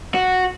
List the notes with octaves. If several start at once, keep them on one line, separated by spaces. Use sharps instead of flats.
F#4